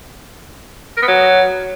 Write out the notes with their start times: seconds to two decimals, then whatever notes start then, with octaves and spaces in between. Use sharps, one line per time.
0.97 A#4
1.03 B3
1.08 F#3